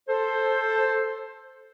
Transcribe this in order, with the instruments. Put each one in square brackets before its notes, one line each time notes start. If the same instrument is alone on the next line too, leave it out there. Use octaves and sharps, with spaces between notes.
[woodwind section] A4 C5